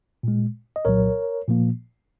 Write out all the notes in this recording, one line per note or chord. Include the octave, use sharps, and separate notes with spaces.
A#2 G#3
D#5
C2 A#2 F#3 A#4 C#5
A#2 F3 A#3